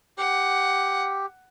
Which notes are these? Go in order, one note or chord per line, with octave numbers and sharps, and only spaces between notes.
G4 F#5